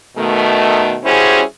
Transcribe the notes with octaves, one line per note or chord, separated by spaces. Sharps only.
B2 D#3 A3
G3 C#4 E4 F#4 G#4 C5